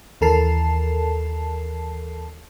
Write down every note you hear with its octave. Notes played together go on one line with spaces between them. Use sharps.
D#2 E3 A4 A#4 A5 C7